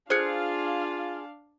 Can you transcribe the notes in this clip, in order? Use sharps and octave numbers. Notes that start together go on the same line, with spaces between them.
D4 F4 G#4 C5 F5 F#6 C#7